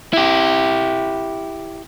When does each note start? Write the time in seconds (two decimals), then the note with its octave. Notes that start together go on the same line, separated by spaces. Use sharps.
0.13 E4 G4